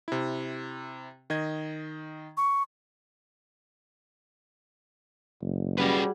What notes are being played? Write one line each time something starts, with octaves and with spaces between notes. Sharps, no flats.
C3 E4
D#3 D#5 G#6
C#6
F#1
G3 C#4 F#4 G#4 B4 F#5